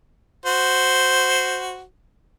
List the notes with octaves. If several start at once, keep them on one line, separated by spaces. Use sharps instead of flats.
F#4 C5